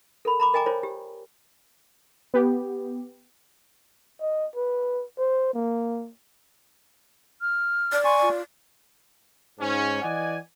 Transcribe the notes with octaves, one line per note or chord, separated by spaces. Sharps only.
A4 A#4 B5
A#5 B5 D6
A#4 D#5 G5 G#5 A#5 D6
F4 A#4 C5 C#5
G4
B3 G4
D#5
B4
C5
A#3
F6
D5
G#5 C6 C#6
F4
G#2 C#4
E3 D5 D#5 F#5 G#5